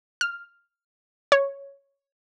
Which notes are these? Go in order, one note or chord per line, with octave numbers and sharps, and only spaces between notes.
F6
C#5